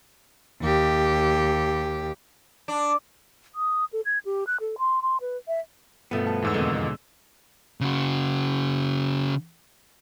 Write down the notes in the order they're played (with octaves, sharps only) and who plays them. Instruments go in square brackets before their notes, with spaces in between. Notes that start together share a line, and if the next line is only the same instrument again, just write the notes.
[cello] D#2 G4
[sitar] D4
[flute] D#6
A4
G#6
G4
F#6
A4
C6
C6
B4
E5
[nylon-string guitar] G2 B2 F3 [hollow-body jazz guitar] A3 B3
[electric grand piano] A5
E2 G#2 E6
[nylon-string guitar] F2 D#3 [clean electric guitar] B2 D3 G#3
[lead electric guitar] C#3 F#4